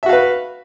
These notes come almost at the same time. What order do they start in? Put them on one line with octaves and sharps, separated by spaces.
E5 F#4 F5 B4